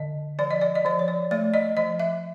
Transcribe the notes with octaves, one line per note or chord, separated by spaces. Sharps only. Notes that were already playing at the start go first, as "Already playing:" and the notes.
Already playing: D3 D#5
F3 D5
D#5
D5
D#5
F3 D5
C#5
D5
A3 D5
D#5
F3 D#5
E5